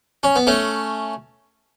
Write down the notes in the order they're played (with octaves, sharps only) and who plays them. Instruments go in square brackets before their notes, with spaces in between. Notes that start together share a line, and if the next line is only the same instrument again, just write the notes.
[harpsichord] C#4
B3
A3 C#4